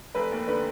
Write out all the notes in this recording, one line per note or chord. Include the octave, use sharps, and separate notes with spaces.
F1 B4
D#2
D3 B4